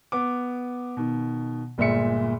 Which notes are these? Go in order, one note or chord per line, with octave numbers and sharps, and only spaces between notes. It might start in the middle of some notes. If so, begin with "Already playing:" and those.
B3 D6
B2 D#3
G1 A#2 G#3 E5 C#7